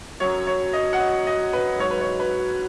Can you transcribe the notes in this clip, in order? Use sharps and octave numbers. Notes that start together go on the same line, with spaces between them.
F#2 F#3 C#5
C#5
D#5
F#5
D#5
D#5
B4
G#2 F#3 C#5
B4
C#5
B4